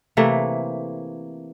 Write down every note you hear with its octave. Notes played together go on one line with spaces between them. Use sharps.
C3 E3 A3 A#3